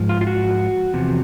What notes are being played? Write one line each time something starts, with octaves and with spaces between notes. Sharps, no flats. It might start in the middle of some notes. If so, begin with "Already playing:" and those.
Already playing: G#2 F3
F4
F4
F#4
E2 C3 F3